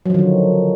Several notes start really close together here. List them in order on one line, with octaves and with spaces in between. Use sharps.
F#3 F3 D#3 D3